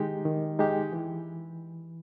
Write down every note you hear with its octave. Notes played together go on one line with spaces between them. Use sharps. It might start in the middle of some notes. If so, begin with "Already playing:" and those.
Already playing: D#3 G#3 D#4 G4
D#3
G#3 D#4 G4
E3